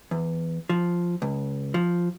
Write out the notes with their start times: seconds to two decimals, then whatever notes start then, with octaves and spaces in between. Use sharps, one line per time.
0.11 E2
0.70 F3
1.22 C#2
1.74 F3